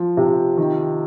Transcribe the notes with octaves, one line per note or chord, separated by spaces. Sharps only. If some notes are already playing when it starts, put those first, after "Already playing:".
Already playing: F3
C3
D#3